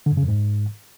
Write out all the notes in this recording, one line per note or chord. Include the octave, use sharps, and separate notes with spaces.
D3
F#2
C#3
F2
G#2